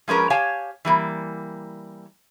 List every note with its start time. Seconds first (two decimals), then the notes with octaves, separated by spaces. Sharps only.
0.08 F3 G#3 C#4 A#4 B4
0.30 G4 C#5 F5 G#5 A5
0.85 E3 G3 A#3